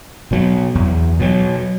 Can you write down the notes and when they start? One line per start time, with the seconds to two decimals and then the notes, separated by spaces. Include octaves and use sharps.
0.31 B2 F#3
0.75 E2
1.20 B2 F#3